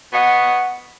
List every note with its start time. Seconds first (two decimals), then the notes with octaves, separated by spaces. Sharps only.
0.13 B3 C#5 D#5 F#5